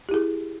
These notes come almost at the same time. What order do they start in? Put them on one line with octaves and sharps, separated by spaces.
G4 E4 G#4